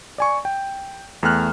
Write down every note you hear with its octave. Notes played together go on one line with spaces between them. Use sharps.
D5 G#5 C#6
G5
E2 A3 G5 F6 F#6